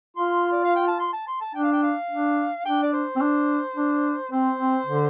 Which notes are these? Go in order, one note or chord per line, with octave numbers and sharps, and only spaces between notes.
F4 C6
D5
F5
G5
A5
C6
A5
C6
A5
D4 G5
F5
G5
F5
D4
D4 G5
D5
C5
C4
D4
D4
C4 C5
C4
D3